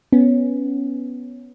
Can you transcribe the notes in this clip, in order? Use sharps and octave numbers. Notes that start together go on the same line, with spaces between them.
B3 C#4